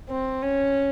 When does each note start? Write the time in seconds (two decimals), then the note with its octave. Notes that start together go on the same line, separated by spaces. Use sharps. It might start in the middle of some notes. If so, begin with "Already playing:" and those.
0.10 C4
0.42 C#4